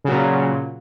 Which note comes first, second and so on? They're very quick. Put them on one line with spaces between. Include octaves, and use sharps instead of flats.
C#3 F#3 A#2